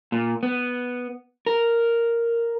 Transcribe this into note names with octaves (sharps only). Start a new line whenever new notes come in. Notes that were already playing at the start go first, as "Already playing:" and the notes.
A#2
B3
A#4